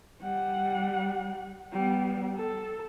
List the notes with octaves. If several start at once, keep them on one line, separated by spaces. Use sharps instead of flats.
G3 F#5
G3 B3
A4